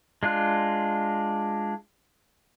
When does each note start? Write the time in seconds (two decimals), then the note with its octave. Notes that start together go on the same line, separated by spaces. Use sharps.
0.23 G#3 D4 F4 F#6